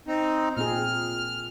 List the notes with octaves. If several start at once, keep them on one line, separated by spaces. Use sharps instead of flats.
C4 D#4
A#2 C4 G#4 F6